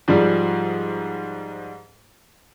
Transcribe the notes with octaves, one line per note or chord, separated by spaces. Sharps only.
G#2 F3 G3